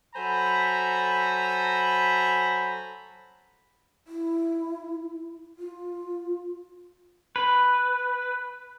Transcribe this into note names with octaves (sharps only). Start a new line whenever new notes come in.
F#3 A4 C5 G#5 A#5 B5
E4
F4
B4